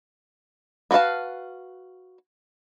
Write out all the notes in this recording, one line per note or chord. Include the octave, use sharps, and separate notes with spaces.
B3 F#4 B4 F5 A5